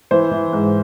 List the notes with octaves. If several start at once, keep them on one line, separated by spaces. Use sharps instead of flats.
E3 C5
E3
G#2